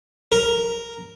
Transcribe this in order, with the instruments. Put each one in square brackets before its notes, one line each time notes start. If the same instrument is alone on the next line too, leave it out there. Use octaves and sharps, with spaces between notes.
[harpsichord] A#4